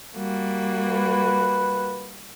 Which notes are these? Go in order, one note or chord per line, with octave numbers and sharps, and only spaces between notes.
G3 A#3 F#4
B4